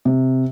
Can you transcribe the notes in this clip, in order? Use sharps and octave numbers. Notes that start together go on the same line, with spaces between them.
C3